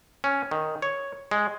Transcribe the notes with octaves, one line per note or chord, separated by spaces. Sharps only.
C#4
D#3
C#5
G#3